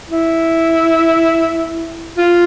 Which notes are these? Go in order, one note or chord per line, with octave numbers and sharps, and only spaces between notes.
E4
F4